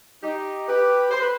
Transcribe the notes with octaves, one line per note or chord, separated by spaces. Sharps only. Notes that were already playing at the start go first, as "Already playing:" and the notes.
D#4 G4
G4 B4
C5
B4